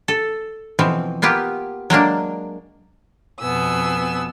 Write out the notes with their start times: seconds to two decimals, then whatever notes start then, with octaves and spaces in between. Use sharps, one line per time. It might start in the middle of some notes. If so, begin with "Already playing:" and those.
0.08 A4
0.79 B2 E3 F3 C4
1.22 A#3 B3 F4 G4
1.90 F#3 G#3 A#3 D4
3.41 F2 B2 B3 G#5 E6